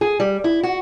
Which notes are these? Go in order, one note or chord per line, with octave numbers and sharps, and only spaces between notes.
G#4
G3
E4
F#4